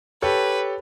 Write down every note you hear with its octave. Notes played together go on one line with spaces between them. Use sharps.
G4 A4 B4 C#5